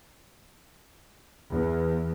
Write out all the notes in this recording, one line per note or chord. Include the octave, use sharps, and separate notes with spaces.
E2